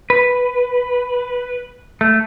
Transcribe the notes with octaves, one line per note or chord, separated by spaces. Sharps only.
B4
A3